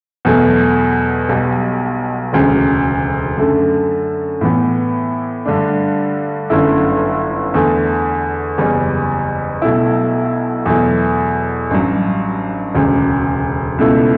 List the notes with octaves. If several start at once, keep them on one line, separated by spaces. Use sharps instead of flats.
E2 B2 F#3 A3
B1 B2 G3
E1 D2 C#3
F#2 D3 A3
A2 E3 B3
G2 D3 A3 D4
G1 F#2 D3 A3 E4
E2 D3 A3
F#1 E2 C#3 G3 C#4
B1 B2 A3 E4
E2 B2 F#3 A3 E4
A1 G2 F#3
E1 D2 C#3
C#2 B2 A3 E4